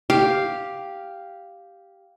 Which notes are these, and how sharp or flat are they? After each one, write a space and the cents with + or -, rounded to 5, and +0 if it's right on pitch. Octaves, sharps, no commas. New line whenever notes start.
G4 +0 F5 +0